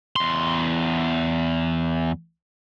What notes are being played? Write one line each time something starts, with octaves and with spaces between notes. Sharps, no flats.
E2 C6